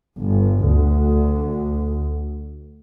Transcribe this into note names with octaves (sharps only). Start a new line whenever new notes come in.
G1
D2